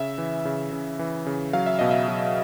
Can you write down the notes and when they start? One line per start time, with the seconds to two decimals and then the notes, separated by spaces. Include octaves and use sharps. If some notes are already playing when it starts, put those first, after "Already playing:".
Already playing: C#3 E5
0.18 E3
0.45 C#3
0.72 C#3
0.99 E3
1.26 C#3
1.53 F#3 F5
1.66 E5
1.79 B2 D#5
1.91 E5
2.08 F#3